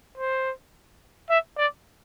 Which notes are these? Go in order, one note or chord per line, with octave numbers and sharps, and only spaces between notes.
C5
E5
D5